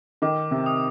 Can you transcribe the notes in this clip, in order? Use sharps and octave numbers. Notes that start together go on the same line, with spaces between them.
D#3 D6
C3
D#6